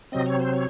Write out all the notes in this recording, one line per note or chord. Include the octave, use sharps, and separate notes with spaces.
C3 F#3 C4 D#5
C#5
C5
C#5